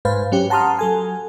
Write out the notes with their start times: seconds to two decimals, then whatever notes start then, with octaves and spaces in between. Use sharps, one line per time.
0.05 G#2 B4 C5 F5
0.32 F#3 C#4 G4
0.50 F#5 A5 A#5 C6 D#6 F6
0.79 F#3 A4 G#5